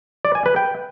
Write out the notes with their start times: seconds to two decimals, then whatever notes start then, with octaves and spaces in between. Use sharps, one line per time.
0.25 D5
0.35 G#5
0.46 B4
0.56 G5